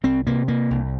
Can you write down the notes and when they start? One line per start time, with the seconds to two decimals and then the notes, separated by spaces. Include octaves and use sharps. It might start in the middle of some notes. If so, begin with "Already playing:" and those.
0.04 C2 C4
0.27 C3 A#3
0.48 C3 A#3
0.71 C2